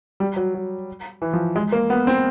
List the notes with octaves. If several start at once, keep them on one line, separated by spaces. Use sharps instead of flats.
G3
F#3
F#3
E3
F3
G#3
A#3
B3
C4